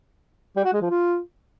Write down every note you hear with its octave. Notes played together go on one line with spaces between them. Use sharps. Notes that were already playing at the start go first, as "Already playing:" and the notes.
G3
F#4
G#3
F3
F4